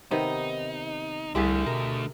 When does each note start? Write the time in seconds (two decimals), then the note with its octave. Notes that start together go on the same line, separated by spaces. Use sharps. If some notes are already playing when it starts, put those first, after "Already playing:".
0.11 C3 D#3 B3 D#4
1.35 C2 D3 A3 G4 G#4 E5
1.66 B2 A#4